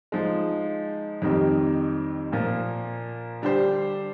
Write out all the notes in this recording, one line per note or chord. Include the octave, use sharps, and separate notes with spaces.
F3 G#3 D#4
F2 D#3 G3 C4 G4
A#2 F3 A#3
D3 G3 D4 G4 C5